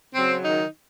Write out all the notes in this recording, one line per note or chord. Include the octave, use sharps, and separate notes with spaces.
C#3 F#3 C4
D#3 D#4